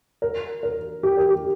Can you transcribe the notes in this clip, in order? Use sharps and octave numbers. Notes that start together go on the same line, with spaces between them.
A#4
A#4
G4
A#4
G4